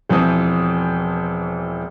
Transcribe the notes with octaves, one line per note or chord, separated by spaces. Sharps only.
E1 E3 F3 C4 C5 D#6